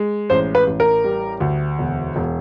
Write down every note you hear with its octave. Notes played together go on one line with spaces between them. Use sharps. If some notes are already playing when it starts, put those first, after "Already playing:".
Already playing: G#3
A1 C5
B4
A1
A#4
G3
D2
E1
E1